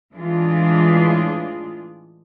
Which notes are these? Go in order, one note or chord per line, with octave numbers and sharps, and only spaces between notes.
A2 E3 G#3 D4 F4 G#4